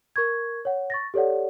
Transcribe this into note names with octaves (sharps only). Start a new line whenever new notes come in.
A#4 C#6 G#6
C#5 F#5
C#6 A6 A#6
G4 A4 C#5 D5 F#5